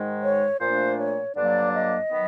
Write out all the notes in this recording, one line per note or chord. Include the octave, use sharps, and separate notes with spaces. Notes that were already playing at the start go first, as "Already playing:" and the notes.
Already playing: G#2 D#3 G#3
C#5
A#2 F3 A3 D4 C5
C#5
G2 D3 F#3 A#3 D4 D5
D#5
D#3 F#3 B3